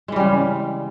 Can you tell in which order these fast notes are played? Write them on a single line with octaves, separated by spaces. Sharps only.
G#3 E3 G3 C#3